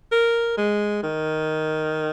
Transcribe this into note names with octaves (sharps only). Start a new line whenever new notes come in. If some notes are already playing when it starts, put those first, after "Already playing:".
A#4
G#3
D#3